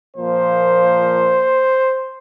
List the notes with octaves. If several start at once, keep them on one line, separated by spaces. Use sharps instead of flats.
A#2 F3 A#3 C5